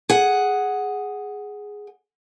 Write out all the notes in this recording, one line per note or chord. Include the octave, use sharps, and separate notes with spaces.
G#4 F#5